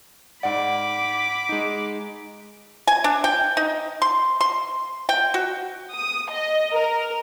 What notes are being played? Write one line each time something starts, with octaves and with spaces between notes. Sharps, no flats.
G#2 D5 F#5 B5 D6
G#3 D#4
G#5
D4
G5
D#4
C6
C6
G5
F#4
D#6
D#5
A#4